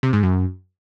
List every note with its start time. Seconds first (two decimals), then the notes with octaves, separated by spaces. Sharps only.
0.03 C3
0.13 G#2
0.23 F#2